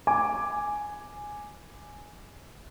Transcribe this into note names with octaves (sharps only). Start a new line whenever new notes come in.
G#5 D6